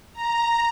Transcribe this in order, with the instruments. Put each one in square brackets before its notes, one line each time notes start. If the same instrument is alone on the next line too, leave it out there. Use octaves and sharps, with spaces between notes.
[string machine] A#5